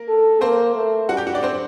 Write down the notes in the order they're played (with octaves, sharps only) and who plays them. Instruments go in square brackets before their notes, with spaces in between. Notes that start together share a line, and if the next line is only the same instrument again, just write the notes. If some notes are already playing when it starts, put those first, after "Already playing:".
Already playing: [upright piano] A#3 A#4
[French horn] A4
[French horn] A#3 [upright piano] C4 C5
[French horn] A3
[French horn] G3 [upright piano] F#4 F#5
[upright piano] G4 G5
F#4 F#5
D4 D5
C4 C5